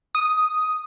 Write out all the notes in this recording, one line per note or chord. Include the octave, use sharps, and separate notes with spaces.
D#6